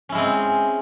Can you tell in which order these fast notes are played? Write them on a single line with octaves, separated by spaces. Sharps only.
C#4 E4 G#3 C4